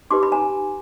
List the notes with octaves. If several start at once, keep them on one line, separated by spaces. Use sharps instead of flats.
D#4 G4 B4 C6 D6
B5
G#5 A#5